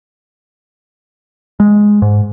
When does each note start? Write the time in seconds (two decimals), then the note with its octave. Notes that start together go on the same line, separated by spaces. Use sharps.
1.60 G#3
2.02 G#2